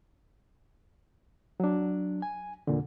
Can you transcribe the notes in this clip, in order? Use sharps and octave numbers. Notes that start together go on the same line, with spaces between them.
F#3 D4
G#5
E2 A#2 D3